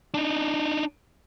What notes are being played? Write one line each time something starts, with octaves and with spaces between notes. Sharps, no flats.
D4 D#4